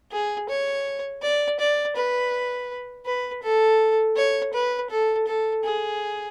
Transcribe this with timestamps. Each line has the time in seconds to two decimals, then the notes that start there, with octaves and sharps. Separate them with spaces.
0.12 G#4
0.49 C#5
1.22 D5
1.60 D5
1.96 B4
3.06 B4
3.43 A4
4.16 C#5
4.53 B4
4.90 A4
5.27 A4
5.64 G#4